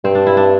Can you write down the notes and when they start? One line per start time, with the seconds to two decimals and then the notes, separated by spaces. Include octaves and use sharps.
0.04 G2 C4
0.15 D4
0.27 E4
0.37 D4